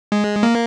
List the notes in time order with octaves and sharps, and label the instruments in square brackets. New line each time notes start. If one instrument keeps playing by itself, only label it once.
[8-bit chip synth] G#3
A#3